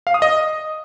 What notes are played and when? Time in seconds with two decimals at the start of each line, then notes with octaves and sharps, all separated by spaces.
0.07 F5
0.14 D#6
0.22 D#5